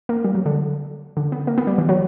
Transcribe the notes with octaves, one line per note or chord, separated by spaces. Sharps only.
A#3
G3
F#3
D3
D3
B3
A#3
B3
G3
E3
F#3